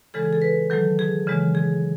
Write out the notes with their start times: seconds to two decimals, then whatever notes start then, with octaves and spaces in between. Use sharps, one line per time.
0.14 C#3 E3 G#3 A4
0.23 G#4
0.33 A4
0.42 B4
0.70 D#3 F#3 A3 A4
0.99 G#4
1.27 C#3 E3 G#3
1.55 G#4